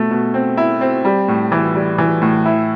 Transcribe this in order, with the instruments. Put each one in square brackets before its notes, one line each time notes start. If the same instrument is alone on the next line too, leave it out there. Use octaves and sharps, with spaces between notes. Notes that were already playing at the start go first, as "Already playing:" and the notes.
Already playing: [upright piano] B2 A3
B2
C4
E4
C4
G3
A2
E3
G3
E3
A2
E4